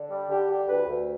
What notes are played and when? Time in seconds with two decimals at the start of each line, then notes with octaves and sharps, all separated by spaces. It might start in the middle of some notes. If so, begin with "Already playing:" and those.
Already playing: D3
0.10 G3
0.29 D3 G4
0.49 G3 G4
0.68 D2 B4
0.88 D2